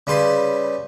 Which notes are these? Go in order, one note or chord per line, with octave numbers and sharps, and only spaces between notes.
C#3 G3 B4 C6